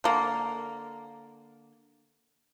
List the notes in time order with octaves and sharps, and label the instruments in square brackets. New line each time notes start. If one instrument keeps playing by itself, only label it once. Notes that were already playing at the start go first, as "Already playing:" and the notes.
[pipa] D3 A#3